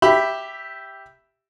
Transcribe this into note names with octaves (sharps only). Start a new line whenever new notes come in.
G4 E5 B5